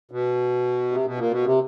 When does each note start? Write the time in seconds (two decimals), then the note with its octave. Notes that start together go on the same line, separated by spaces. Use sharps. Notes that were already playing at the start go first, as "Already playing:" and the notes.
0.11 B2
0.92 C3
1.05 B2
1.18 A#2
1.31 B2
1.46 C3